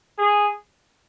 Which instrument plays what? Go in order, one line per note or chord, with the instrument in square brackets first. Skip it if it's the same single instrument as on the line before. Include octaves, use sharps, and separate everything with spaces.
[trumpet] G#4